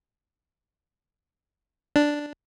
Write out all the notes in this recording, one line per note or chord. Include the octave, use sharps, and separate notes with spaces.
D4